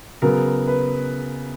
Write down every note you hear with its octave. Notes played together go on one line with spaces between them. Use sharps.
C#3 F#3 B3 A#4
B4